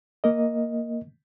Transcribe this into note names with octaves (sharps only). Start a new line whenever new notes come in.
A#3 A#4 D#5